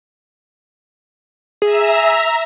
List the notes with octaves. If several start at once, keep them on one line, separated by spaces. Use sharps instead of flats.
G#4 E5 A#5 E6